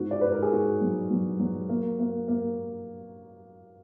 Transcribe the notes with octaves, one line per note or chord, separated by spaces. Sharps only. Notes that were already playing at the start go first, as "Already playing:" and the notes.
Already playing: G#2 F#4
D5
G#2 B4
A#4
G#4
G#2 F#4
F#3
F#3
F#3
A#3
A#3
A#3